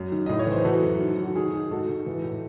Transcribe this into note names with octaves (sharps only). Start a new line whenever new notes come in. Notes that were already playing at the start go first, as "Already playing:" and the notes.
Already playing: F#2
D#3
A2 D#5
C#5
E3
C5
E3 F#4 A4
F#2
D#3
D#3 F#4
D#3 G#4
D#3
G#2 F#4 A4
G#2
E3
A2